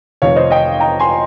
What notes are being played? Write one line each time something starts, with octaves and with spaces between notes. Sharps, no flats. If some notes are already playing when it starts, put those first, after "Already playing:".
F1 F2 D#3 C#5 F5
C5 D#5
D#5 G5
G5 A#5
G#5 C6